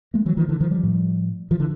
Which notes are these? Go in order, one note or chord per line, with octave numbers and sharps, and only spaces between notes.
G#3 A#3
E3 F#3
D#3 F3
D3 E3
D#3 F3
F3 G3
A2
D#3 F3
D3 E3